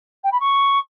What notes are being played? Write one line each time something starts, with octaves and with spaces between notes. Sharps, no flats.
G5
B5
C#6